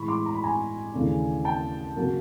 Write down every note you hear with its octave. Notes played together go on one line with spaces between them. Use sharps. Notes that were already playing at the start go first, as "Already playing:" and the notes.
Already playing: A2 E3 G#3 B5 C#6
C6 D6
A#5
B5
G#5 A#5
D#2 C#3 E3 A3 D4
G5 A5
C#3 F#3 A#3